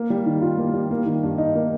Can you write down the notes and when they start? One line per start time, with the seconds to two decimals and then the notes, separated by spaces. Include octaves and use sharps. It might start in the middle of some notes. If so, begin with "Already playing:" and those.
Already playing: A#3
0.10 G3
0.26 D#3
0.42 F4
0.58 A#3
0.74 G3
0.91 A#3
1.06 D#3
1.23 G2
1.38 D#4
1.55 A#3